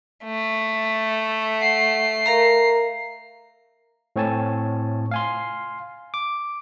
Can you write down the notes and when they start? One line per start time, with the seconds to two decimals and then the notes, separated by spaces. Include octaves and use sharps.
0.25 A3
1.61 F#5 C7
2.26 A#4 F5 A#5
4.16 A2 C4 C#5 G#5 A5
5.11 F5 G#5 C6
6.14 D6